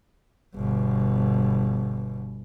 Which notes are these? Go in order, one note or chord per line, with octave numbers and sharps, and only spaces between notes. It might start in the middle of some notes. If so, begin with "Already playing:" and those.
G1 B2